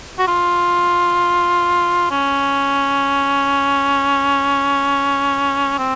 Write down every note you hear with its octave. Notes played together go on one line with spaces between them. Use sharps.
F#4
F4
C#4
C4